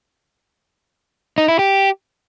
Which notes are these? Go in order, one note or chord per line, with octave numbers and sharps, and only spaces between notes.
D#4
E4
G4